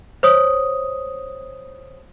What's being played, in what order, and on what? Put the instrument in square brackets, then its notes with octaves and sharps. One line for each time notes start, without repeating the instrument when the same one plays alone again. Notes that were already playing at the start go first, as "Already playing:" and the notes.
[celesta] C5 C#5 D#6